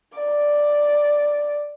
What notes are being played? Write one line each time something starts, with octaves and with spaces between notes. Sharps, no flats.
D5